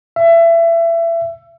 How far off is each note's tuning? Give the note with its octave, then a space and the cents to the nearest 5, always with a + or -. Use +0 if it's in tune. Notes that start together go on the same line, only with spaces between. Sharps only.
E5 +25